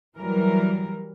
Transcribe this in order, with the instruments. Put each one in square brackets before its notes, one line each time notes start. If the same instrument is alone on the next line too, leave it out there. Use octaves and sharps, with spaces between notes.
[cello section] E3 F#3 G3 A#4